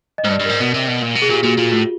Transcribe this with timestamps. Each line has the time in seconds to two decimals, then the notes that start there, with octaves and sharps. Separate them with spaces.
0.18 D#5
0.24 G#2
0.28 G2
0.31 D5
0.39 G2
0.45 G#2 A#4
0.60 B2
0.74 C3
0.88 B2
1.02 A#2
1.16 B2
1.22 G#4
1.30 A#2 G4
1.44 A#2 F#4
1.58 A#2 F4
1.72 A2 F4